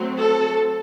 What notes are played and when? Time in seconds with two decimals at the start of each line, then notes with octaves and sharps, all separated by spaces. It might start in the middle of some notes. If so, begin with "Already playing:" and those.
Already playing: F#3 A3 C4
0.18 A4